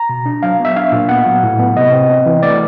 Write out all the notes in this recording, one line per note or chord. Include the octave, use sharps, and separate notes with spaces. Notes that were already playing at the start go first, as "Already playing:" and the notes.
Already playing: A#5
B2
D4
F#3 F5
B3
E5
D4 F5
A#2
B3 F#5
F#3
A2
B3
C3 D#5
C4
C4
E3
A3 D5